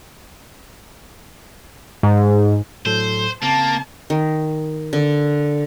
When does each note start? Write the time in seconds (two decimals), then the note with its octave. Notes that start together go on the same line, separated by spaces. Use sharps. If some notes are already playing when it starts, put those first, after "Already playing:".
2.03 G#2
2.86 A2 F#3 A4 C5
3.42 C#3 A#3 C4 A5
4.10 D#3
4.93 D3